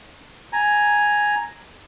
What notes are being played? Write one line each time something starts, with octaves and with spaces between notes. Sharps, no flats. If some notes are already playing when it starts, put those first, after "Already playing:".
G#5 A#5